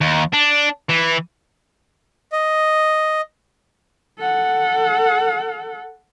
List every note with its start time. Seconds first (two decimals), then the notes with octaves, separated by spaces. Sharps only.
0.01 D#2
0.33 D4
0.90 E3
2.32 D#5
4.19 A4 F#5